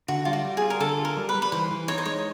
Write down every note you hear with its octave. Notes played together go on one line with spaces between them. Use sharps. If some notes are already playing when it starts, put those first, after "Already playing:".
D3 F#4
G3 F4
F#4
G3
F4 G#4
A#4
D3 A4
F4
A#4
G3
B4
G3
B4
E3 C5
E3
D#4 C#5
C5
G#3 C#5